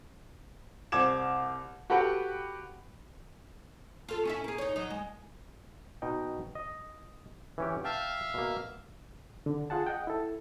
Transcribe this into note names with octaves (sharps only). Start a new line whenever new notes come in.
C2 C5 D6 G#6 E7
F#4 G4 A4 B4 F#5 G5
F4 A4
C#4 E4 E5
A#3 G#4
D#4 C#5
F#3 D#4
G#3
B2 D#4 G5
D#5
E3 C#4 G4
E5 F5 G5 A5
B2 A#3
D3
F4 G#4 F#5 A5
D#5 F#5 G5
E4 A4